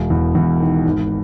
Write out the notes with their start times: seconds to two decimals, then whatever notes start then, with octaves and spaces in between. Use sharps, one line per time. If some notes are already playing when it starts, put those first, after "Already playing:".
Already playing: E1
0.10 E2
0.35 E2
0.60 D#3
0.85 G#1